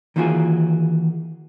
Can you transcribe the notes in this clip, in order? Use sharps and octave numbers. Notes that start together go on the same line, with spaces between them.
D#3 E3 A#3 F4 F#4 G#4